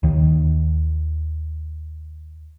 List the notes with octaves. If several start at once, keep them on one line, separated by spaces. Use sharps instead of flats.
D#2 D#3